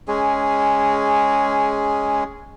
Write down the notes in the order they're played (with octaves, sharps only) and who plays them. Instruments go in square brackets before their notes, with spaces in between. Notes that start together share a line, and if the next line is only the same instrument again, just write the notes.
[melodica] G#3 C#4 G#4